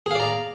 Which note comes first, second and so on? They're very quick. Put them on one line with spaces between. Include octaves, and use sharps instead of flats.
G#4 F5 D5 A#5